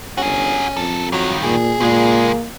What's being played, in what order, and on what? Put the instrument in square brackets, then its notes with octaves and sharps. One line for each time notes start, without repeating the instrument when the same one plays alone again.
[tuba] G1 [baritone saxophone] C#4 [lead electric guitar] F#4 G#4
[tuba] F2 [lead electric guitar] A#3 A4
[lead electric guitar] G2 D#3 [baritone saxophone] F#3
[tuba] A#2 [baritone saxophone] G#4
[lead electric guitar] C#2 G#3 [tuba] A#2 [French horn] A#3